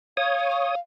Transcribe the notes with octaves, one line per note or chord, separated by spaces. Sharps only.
C#5 F5 D#6